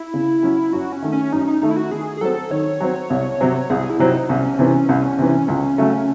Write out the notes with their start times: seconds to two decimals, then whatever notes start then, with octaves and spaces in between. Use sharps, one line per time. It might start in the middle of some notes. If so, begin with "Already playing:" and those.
Already playing: E4
0.14 C#3
0.43 F#3 C#4
0.73 F#2 F#4
0.92 C#4
1.02 D#3 A3
1.12 C#4
1.32 F#2 D#4
1.47 D#4
1.62 D#3 A3 D#4
1.71 E4
1.77 F#4
1.91 D#3 G#4
2.17 G#4
2.21 F#3 C4 A4
2.50 D#3 C#5
2.81 F#3 C4
3.10 C2
3.41 C3 F#3 C4
3.70 C2 G#4
3.90 E4
3.99 C3 F#3 C4
4.09 D#4
4.29 C2 C#4
4.59 C3 E3
4.89 C2
5.18 C3 E3
5.48 C#2
5.78 C#3 F#3 A3